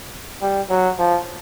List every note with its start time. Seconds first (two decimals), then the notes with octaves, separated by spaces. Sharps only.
0.42 G3
0.69 F#3
0.99 F3